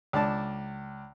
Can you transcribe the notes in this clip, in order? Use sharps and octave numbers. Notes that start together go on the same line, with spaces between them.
C#2 D4 A5